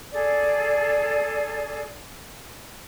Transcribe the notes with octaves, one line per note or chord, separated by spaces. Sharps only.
G#4 A4 D5